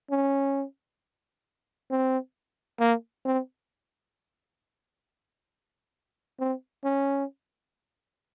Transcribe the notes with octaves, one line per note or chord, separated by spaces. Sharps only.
C#4
C4
A#3
C4
C4
C#4